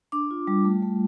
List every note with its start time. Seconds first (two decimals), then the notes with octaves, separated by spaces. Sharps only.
0.12 D4 D6
0.31 F4
0.47 G3
0.65 A3
0.82 A3